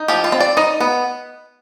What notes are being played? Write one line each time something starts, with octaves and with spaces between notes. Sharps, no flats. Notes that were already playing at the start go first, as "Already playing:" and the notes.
Already playing: D#4
F3 G4
F4
C4
D5
D#4 D#5
B3